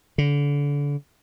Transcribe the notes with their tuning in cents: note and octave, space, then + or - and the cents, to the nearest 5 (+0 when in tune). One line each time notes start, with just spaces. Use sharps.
D3 -30